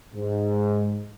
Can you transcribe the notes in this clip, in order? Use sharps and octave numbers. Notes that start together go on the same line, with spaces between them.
G#2